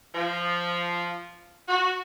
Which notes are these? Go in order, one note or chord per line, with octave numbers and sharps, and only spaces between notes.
F3
F#4